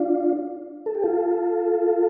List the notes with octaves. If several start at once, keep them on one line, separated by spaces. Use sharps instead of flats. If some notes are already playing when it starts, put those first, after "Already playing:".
Already playing: D4 F4
A4
G4
F4 A4